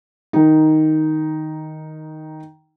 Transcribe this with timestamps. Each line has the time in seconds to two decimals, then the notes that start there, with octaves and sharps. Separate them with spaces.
0.33 D#3 D#4